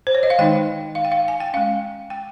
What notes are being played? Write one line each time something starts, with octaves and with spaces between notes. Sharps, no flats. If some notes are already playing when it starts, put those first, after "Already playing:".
C5
C#5
D#5
F5
D#3 G#3 D#4 G5
F5
G5
F5
G#5
G5
G#3 C#4 F5
G5